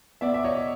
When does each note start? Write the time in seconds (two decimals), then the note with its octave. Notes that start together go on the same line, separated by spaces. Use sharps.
0.21 B3 D5 E5
0.34 E5
0.44 C#5 D#5